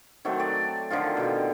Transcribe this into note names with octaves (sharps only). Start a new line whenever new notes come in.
D#3 F#3 A3 C4
D5
D3 D#3 F3 F4
B2 G4